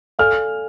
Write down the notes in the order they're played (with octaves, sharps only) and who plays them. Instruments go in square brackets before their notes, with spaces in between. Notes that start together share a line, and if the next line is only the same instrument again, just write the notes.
[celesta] A4 D5 F5 G#5 [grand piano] F6